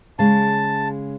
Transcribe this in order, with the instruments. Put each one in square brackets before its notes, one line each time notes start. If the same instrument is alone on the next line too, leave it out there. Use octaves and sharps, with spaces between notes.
[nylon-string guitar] C#3 G#3 [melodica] A5